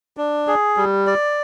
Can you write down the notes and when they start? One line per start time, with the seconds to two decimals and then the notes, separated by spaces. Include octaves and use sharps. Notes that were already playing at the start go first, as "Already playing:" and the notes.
0.17 D4
0.47 G#4
0.77 G3
1.07 D5